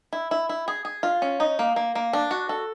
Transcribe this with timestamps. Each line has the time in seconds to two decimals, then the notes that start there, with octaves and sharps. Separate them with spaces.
0.13 E4
0.31 E4
0.49 E4
0.68 G#4
0.85 G#4
1.03 F4
1.22 C#4
1.40 D#4
1.59 A#3
1.76 A#3
1.95 A#3
2.13 D4
2.31 F#4
2.49 A4